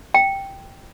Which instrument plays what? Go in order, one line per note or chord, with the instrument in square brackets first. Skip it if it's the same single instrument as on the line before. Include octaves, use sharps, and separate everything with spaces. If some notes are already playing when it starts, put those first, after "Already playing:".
[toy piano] G5